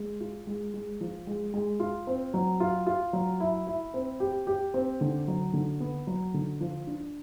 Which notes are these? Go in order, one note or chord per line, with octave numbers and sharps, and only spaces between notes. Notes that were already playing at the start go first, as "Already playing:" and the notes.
Already playing: G#3
F4
G#3
G#3
F3
G#3
G#3
F4
C4
F#3
F4
F4
F#3
E4
E4
C4
G4
G4
C4
D3
F#3
D3
B3
F#3
D3
F3
D4